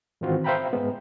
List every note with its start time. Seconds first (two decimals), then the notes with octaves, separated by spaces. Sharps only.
0.21 G#2 D#3 E3 C4 F4 F#4
0.44 C5 E5 F5 G5 A#5 B5
0.73 G#2 G#3 B3